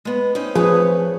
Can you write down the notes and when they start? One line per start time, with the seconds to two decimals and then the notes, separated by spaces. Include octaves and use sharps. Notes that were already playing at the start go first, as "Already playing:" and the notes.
0.05 G#3 B3
0.35 C4 C#4 D#4
0.55 F3 A3 G#4 B4 C#5